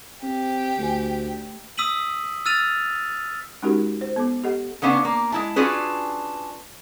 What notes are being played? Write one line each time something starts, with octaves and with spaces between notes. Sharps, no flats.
C4 G4
D2 A3 G#5
D#6 E6 B6 D#7 F#7
E6 F6 A6 D#7 F7
G#3 C#4 D#4 F#4 G4 A#4
C5
B3 A4 D6
G4 A4 D#5 F#5
C#3 B3 C#4 D4 F5
A#3
G#3 E4 A5
C#4 D4 F4 F#4 G#4 B4